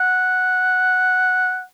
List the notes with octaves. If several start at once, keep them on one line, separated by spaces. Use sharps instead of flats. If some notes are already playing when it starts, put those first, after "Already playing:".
Already playing: F#5